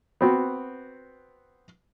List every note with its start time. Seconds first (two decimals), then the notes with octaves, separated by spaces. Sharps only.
0.21 B3 C4 F#4